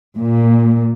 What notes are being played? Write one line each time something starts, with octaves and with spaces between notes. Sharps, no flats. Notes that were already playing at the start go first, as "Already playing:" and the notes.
A#2